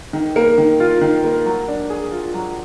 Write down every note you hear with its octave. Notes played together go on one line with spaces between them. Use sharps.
D#3
A#3
D#3
F4
D#3
A#3
F#3
D4
G#4
F4
F#3